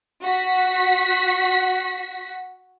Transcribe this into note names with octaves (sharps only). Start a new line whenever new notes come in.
F#4 B6